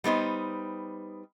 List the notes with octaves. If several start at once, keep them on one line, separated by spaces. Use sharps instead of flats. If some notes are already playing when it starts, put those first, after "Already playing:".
G3 B3 D#4 C5